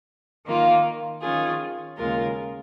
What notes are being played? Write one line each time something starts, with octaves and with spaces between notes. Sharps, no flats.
D#3 A#3 F4
D#3 C#4 F4 G#4
D#2 C#3 G#3 F4 A#4